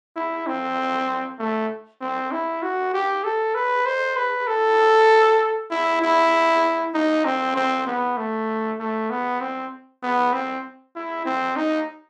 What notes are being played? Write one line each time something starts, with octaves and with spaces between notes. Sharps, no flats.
E4
C4
A3
C4
E4
F#4
G4
A4
B4
C5
B4
A4
E4
E4
D#4
C4
C4
B3
A3
A3
B3
C4
B3
C4
E4
C4
D#4